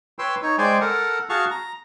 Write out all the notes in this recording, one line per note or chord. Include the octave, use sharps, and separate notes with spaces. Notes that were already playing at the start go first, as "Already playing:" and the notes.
B4 C#5 G5 C6 E6
D#4 C#5
G#3 C5 D5 G5 G#5
A4 A#4 F#5
F#4 G#4 F5 A5 C#6 F6
A#5